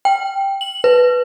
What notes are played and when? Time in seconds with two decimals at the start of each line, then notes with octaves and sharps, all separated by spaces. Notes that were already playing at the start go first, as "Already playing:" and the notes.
0.05 G5
0.61 F#7
0.84 B4